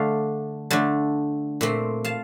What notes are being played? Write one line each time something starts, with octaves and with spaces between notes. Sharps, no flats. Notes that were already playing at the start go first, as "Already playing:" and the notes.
Already playing: D3 A3 D4 F5
D3 A3 D4
A#2 A3 C4
F5 A5